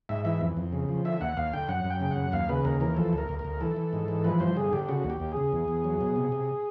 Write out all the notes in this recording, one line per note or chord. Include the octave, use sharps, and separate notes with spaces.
G#2 E5
E3 E5
F2
F2
C#3
F3
D3 E5
D#2 F#5
D#2 F5
D3 G5
F#2 F#5
F#2
G5
C#3
F#5
F#2
D#2 F5
C#3 B4
D#2 A#4
E3 A#4
F3 A4
D2 A#4
D2
A#4
D2
E3 A4
E3
G#2
E3
F3 B4
G2 C5
D3 G#4
D3 G4
C#3 F#4
D#2
G4
D#2
G#4
C#3
E2
E2
F#3
B2
C3
C3